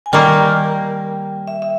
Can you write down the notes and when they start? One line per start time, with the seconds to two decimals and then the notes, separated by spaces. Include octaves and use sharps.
0.06 G#5
0.12 D#3 G3 A#3 G5
1.48 E5
1.62 E5